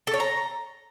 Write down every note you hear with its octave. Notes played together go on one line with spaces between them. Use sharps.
A4
C#5
A#5